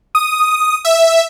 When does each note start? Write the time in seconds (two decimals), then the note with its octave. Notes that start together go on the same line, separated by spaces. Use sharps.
0.15 D#6
0.85 E5